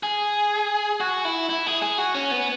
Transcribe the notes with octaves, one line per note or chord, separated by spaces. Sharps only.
G#4
F#4
E4
E4
G#4
G#4
F#4
C#4
B3